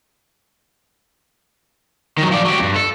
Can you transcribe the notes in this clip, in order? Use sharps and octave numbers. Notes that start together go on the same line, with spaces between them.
D#3 F#3
F3 D5
F#3 G4
E2 G2
A4